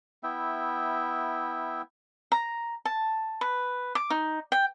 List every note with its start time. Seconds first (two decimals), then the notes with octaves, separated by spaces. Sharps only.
0.23 B3 E4 E5 G5
2.32 A#5
2.85 A5
3.41 B4
3.95 D6
4.10 D#4
4.52 G5